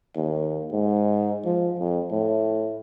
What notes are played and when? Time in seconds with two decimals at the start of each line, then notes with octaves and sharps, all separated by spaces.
0.16 D#2
0.72 G#2
1.45 F3
1.79 F2
2.11 A2